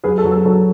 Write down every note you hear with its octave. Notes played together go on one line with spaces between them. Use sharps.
F#3 G#4 B4
A4
F#3
A4
F#3 A4